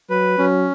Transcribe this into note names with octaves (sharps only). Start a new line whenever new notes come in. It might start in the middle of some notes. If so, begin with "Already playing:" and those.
F#3 B4
F#3 C#4